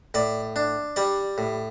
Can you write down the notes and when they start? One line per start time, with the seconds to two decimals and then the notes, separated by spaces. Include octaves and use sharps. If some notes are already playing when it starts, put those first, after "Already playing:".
0.14 A2 D5
0.56 D4
0.96 G3 D5
1.38 A2